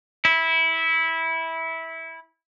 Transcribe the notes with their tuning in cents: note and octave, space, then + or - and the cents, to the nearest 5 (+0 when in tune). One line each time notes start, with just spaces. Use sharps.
E4 -15